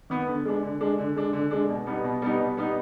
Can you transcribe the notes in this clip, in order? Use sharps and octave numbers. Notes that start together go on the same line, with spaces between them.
D#3 B3
D3
G#3 D4
D3
G#3 D4
D3
G#3 D4
D3
G#3 D4
B2
G3 B3 D#4
B2
G3 B3 D#4
B2
G3 B3 D#4